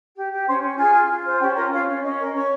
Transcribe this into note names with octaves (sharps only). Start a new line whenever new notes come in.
G4
G4
C#4 C5 C6
C#4
F4 G#4 G#5
F4
F4
C5
C#4 G4 G5
F4 A#4 A#5
C#4 F4 F5
C#4
C#4 D#5
A#4
C#4 C#5